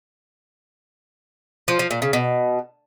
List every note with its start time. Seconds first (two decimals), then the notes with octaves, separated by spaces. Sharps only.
1.68 F3
1.79 F3
1.91 A#2
2.02 C#3
2.13 B2